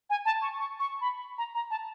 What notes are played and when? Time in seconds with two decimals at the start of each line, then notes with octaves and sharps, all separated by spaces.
0.10 G#5
0.25 A5
0.42 C#6
0.58 C#6
0.79 C#6
1.01 B5
1.38 A#5
1.55 A#5
1.71 A5